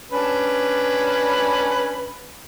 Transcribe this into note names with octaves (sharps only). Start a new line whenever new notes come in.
C#4 D4 B4